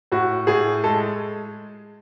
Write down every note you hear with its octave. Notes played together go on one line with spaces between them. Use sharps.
A2 F#4
A2 G#4
G#3 A4